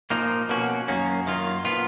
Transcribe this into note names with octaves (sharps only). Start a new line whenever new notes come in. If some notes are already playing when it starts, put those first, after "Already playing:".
A#2 F3 A#3 D#4
B2 A#3 C#4 F#4
F#2 D#3 A#3 C#4
F#2 D#3 A#3 F4
A#2 F3 B3 F4